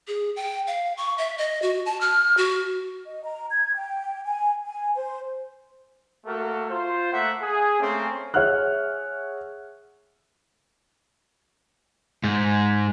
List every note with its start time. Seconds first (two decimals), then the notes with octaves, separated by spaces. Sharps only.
0.08 G#4
0.36 G5
0.67 F5
0.97 C#6
1.18 E5
1.38 D#5
1.62 F#4
1.86 A5
2.01 F6
2.37 F#4
3.07 D#5
3.24 A#5
3.51 G#6
3.74 G5
4.26 G#5
4.65 G#5
4.95 C5
6.26 A3 A#3 F#4 A4 A#4
6.70 F4 C5
7.12 A3 A#3 E5 F#5
7.42 G#4
7.80 A3 A#3 C4 C#4
8.34 G#4 C#5 E5 F#5 F6 F#6
12.24 G#2